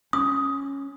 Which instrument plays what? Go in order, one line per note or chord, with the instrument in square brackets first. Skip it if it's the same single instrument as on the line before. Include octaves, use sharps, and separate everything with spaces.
[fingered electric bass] C#4 [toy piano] D#6